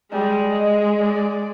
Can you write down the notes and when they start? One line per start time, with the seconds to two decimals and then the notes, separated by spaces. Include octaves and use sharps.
0.12 G3 G#3
0.51 D#5
1.00 D5